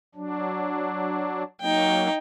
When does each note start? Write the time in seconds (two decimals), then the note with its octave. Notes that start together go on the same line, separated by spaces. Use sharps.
0.15 F#3 D4
1.61 F#3 A#3 D#4 G5